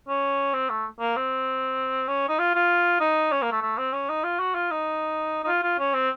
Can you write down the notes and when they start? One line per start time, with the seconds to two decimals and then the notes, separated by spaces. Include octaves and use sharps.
0.08 C#4
0.54 C4
0.70 A3
1.00 A#3
1.16 C4
2.08 C#4
2.29 D#4
2.39 F4
2.55 F4
3.00 D#4
3.32 C#4
3.42 A#3
3.52 A3
3.62 A3
3.78 C4
3.93 C#4
4.09 D#4
4.24 F4
4.40 F#4
4.55 F4
4.71 D#4
5.44 D#4
5.47 F4
5.63 F4
5.79 C#4
5.94 C4